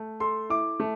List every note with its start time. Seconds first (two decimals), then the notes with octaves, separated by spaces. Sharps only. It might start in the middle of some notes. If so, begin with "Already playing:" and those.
Already playing: A3
0.20 A4 C6
0.50 E4 D6
0.80 A3